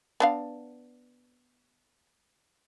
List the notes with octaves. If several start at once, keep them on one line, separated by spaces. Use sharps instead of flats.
B3 D4 F5